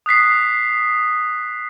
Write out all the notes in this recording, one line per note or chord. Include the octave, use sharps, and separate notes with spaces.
D#6 F#6 B6 C7